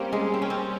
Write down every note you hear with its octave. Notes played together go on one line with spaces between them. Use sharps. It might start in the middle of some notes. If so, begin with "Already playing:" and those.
Already playing: G3 A#3 C4 C#4 G4
G#3
C4
C#4
C4